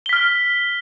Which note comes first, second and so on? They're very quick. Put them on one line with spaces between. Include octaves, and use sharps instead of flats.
G7 B6 F6